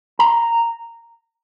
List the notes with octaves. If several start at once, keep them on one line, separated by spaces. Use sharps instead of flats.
A#5